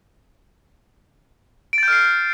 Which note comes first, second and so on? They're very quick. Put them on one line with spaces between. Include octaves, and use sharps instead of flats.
D7 A6 G6 F6 C7